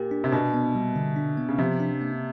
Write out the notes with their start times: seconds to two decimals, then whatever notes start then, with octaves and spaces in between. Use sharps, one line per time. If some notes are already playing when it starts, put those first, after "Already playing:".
Already playing: A#2 G4
0.11 D4
0.24 C3
0.32 B2 D4
0.54 B3
0.75 G3
0.96 D3
1.16 D4
1.38 B3
1.48 C#3
1.58 C3 F3
1.80 D4
2.01 A#3